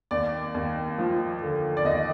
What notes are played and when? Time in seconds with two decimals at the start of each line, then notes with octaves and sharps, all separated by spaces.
0.11 D#2 D5
0.54 D#2
0.98 F3
1.42 D3
1.77 D5
1.84 D#2 D#5